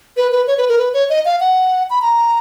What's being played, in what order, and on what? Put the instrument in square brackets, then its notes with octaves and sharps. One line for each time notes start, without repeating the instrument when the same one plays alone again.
[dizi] B4
B4
C#5
B4
A#4
B4
C#5
D#5
F5
F#5
B5
A#5